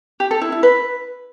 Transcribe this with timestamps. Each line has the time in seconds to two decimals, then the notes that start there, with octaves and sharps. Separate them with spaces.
0.20 G4
0.31 A4
0.41 E4
0.52 E4
0.63 B4